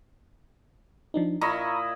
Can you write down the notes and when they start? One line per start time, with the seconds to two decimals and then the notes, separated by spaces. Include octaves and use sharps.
1.14 F3 D4 D#4
1.41 A#2 E4 D#5 A#5 B5 C#6